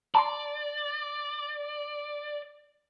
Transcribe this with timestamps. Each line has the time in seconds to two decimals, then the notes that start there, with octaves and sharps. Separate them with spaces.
0.15 D5 A5 A#5 C6